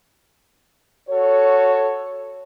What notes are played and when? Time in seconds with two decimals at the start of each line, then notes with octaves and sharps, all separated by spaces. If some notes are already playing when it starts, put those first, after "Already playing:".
1.09 F#4 A4 C#5